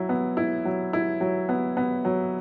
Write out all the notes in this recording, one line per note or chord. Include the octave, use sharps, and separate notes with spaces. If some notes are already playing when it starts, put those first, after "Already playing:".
Already playing: F#3 E4
B3
E4
F#3
E4
F#3
B3
B3
F#3